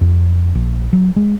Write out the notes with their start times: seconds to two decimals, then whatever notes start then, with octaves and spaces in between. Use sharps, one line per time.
0.01 F2
0.55 A#1
0.93 F#3
1.16 G#3